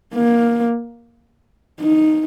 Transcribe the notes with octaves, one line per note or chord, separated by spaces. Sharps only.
A#3
D#4